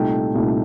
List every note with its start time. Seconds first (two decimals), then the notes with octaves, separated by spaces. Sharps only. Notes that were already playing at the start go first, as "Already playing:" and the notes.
Already playing: C2 A#2 A3 D#4 G5
0.35 C2 A#2 A3 D#4